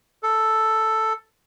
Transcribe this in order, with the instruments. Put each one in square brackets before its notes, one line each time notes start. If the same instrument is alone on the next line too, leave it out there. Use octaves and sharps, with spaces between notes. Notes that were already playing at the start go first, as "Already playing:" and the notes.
[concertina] A4